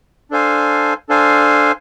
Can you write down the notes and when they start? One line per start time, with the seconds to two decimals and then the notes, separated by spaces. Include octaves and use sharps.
0.31 D4 A4 C5 F5 G#5
1.09 D4 A4 C5 F5 G#5